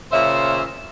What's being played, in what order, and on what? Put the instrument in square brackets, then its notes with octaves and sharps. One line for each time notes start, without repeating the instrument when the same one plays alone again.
[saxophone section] A#2 C#3 C5 E5